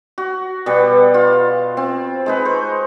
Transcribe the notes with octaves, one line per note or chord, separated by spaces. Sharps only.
F#4
B2 G3 B3
F4
C4
G#3 D#4 B4
C5 C#6